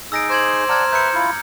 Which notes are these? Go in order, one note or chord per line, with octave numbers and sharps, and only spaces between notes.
D#4 G#4 E6 A#6 D7
C5 D6 G#6 F#7
D5 F#5 A5 A#5 F6 G#6
B4 E5 A#5 G6 C#7
E4 F4